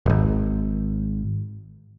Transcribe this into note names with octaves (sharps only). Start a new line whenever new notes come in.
D#1 G#1